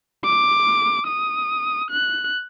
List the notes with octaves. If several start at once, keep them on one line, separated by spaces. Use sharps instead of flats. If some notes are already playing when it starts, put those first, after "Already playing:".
D6
D#6
F#6